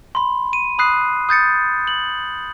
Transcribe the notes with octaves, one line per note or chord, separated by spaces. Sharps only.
B5 C6
D#7
B5 D#6 F#6 C7
D#6 G6 A6 C#7
F#7